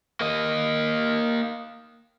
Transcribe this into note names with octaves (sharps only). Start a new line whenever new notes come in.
A#3 D#5